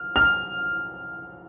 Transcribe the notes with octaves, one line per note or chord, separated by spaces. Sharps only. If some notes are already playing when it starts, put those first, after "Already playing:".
Already playing: F6
F6